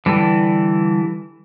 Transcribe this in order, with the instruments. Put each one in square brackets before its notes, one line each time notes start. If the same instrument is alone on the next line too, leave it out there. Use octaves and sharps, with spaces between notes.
[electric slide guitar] D3 G3 A4 [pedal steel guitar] E3